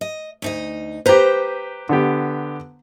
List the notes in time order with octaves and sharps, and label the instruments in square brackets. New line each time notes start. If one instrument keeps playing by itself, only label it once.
[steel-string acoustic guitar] D#5
D2 D#4 D#5
[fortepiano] G4 B4 [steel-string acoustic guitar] C5 A#5
[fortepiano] D3 B3 G4